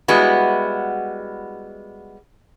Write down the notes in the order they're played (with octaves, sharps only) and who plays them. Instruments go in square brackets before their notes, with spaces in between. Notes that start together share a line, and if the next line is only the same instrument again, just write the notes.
[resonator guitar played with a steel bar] G3 G#3 B3 E4 F#4